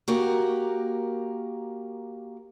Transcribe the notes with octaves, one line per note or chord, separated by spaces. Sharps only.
A#3 F#4 G4 A#4